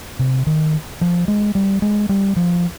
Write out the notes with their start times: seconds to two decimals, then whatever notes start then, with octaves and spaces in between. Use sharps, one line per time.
0.19 C3
0.47 D#3
1.01 F3
1.28 G#3
1.55 G3
1.82 G#3
2.09 G3
2.37 F3